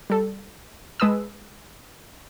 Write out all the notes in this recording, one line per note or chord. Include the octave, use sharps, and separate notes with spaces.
G3 A4
G#3 B4 A5 D#6 E6